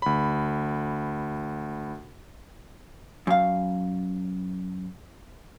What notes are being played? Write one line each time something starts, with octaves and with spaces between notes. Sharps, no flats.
D2 B5
F#2 F5